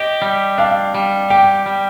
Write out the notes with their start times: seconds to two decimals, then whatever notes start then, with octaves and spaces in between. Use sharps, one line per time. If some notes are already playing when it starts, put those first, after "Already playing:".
Already playing: G4 D#5
0.22 G3
0.58 D4 F5
0.95 G3
1.30 G4 G5
1.66 G3